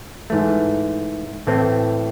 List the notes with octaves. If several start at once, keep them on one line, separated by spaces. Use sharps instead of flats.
G#2 E3 A3
A2 E3 A3 C4